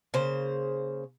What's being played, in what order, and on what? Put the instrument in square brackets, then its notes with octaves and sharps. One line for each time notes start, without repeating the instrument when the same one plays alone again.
[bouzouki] C#3 A#3 C5